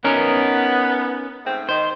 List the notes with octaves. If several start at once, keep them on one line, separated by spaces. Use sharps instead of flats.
B3 C#4 D#4 A#4
G#2 A3 C4
D#3 C5